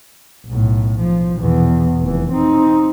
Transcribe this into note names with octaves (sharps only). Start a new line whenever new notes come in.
B1 A2
F3
E2 B2
F1 E3
C4 D#4